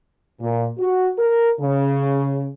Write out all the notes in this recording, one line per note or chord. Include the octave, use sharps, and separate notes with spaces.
A#2
F#4
A#4
C#3